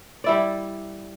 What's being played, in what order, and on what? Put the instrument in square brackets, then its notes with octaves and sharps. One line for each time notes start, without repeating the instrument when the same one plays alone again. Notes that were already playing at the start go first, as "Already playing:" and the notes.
[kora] G3 E4 D5